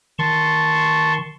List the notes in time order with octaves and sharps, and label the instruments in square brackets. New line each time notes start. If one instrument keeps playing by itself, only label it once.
[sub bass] D#3 [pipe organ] A5 C6 C#6